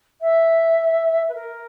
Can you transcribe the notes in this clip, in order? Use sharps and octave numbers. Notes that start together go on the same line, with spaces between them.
E5
B4
A#4